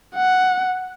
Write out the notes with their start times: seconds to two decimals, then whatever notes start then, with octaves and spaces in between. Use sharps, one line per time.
0.15 F#5